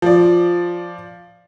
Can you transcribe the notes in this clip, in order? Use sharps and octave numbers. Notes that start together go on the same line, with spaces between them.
F3 D5